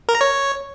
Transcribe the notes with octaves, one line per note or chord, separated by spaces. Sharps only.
A#4
A#5
C#5